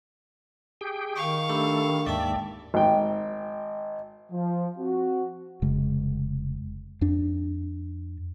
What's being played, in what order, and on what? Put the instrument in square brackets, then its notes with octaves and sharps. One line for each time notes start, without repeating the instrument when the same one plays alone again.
[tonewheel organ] G4 G#4 G5
[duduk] D#3 [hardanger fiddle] F5 C#6
[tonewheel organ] A3 A4 [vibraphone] D4 G4 B5
[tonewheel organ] D#2 G#2 D5 [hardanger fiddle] E5 [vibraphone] G5 A5
[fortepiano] G#1 G5
[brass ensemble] F3
C4 F#4
[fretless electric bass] F1 C#3 G#3
F2 D4